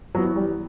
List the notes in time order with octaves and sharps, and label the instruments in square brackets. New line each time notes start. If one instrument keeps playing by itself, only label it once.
[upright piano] E3 B3 [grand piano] F#3
[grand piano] G3